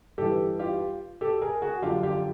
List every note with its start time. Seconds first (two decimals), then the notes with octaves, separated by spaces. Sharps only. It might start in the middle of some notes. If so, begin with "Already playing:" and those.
0.18 G2 E3 G4 A4
0.59 F4 G4
1.21 G4 A4
1.42 G#4 A#4
1.62 F#4 G#4
1.82 F#2 D3 F3 F4 G4
2.03 F4 G4